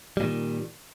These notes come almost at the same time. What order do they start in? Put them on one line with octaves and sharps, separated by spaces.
G3 A#2 D#3